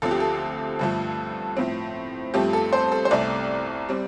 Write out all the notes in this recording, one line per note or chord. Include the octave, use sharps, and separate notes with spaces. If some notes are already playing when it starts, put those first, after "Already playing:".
D2 D3 F3 C4 A4
G4
A4
G2 D3 F3 A3
A2 F3 C4
G2 F3 A3 C4 G4
A4
C5
A4
C5
C2 C3 A3 D5
G3 C4